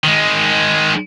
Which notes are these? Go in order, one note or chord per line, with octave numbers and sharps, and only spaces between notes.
D#3 G#3